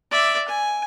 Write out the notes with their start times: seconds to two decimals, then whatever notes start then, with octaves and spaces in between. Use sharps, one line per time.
0.11 D5 E5
0.49 G#5